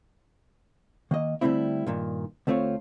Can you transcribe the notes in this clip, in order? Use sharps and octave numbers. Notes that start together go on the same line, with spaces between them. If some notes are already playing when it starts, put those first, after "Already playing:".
D#3 A#3 D#5
D3 E3 G3 A3 C4 E4
G2 A#2 D#3
D2 A3 C4 F4 C#5